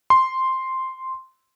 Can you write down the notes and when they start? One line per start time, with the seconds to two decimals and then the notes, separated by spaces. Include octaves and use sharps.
0.10 C6